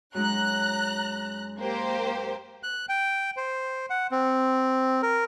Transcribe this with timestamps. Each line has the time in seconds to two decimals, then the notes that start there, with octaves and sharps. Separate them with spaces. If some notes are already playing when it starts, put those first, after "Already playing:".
0.14 F#2 G#3 D#4 A#5 F#6
1.59 A#3 G4 C5
2.63 F#6
2.89 G5
3.37 C5
3.90 F#5
4.12 C4
5.03 A#4